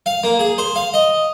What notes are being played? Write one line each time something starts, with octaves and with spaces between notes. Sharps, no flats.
F5
A#3
G#4
C5
F5
D#5